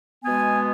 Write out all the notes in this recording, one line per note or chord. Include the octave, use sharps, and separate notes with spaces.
B2 G#3 B3 G#5